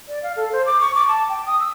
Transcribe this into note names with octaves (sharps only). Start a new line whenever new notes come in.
D5
F5
A4
C5
D6
C#6
D6
A5
G5
D#6
E6